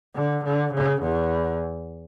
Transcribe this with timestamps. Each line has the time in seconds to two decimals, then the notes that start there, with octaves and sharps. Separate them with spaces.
0.15 D3
0.44 D3
0.73 C#3
1.02 E2